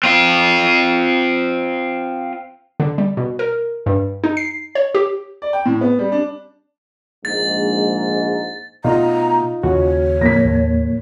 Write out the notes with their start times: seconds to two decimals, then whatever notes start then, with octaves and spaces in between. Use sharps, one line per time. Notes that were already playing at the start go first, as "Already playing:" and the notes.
0.03 C4 F4
2.80 D3
2.98 G3
3.17 B2
3.39 A#4
3.86 G2
4.24 D#4
4.37 C7
4.75 C#5
4.95 G4
5.42 D5
5.53 G5
5.66 A2
5.81 B3
5.99 G3
6.12 D4
7.25 A#1 G#2 A6
8.84 B2 A3 D#4 F4 A#5
9.63 D#2 C#3 C#4 F#4 C#5
10.21 F2 A2 A#3 A#6 B6
10.45 D#2 D3